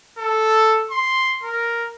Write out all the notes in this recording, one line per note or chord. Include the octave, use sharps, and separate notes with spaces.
A4
C6
A#4